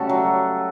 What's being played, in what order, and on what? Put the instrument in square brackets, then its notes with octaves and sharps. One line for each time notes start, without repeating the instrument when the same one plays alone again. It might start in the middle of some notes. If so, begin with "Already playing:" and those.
Already playing: [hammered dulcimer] C#3 G3 A3 F#4 A4
F#3